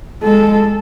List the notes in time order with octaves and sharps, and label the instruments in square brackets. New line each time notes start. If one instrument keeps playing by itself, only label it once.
[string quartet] G#3 [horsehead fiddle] A4